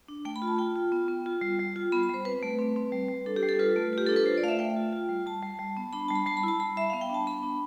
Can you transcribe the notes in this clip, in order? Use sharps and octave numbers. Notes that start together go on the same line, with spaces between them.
D4
A3 G5
B5
F4
A5
F4 G5
F4
B3
B3
F4
G3
G3
F4
B3 B5
B5
G3 C5
C4 B4
A3
C4
C4
G3
G3
D4 A4
G4
G3
A4
F4 B4
A3
F4 G4
D4 A4
B4
F4 C5
D5
A3 F5
E5
A3 G5
F4
F4
G3
G3 A5
G3
G3
B3
D4 B5
G3 A5
B5
G3 A5
B5
E4 A5
G3 B5
G3 E5
B3 F5
G5
D4 A5
B3 B5
D4